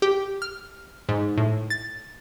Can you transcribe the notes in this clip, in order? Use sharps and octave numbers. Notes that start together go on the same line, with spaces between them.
G4
F6
G#2
A2
A6